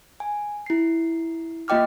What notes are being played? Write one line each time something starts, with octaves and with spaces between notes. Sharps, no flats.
G#5
E4 C7
A#3 F4 D#5 G5 D6 F6